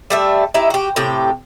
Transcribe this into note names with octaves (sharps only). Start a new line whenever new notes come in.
G3 A3 E5
D#4 E4 G4 E5
F#4 G4
A2 C3 G4